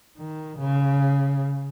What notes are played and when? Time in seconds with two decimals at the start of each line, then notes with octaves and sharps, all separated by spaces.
0.18 D#3
0.58 C#3